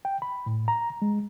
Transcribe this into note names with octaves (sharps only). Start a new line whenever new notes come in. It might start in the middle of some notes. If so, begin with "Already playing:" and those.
G5
B5
A2
A#5
G#3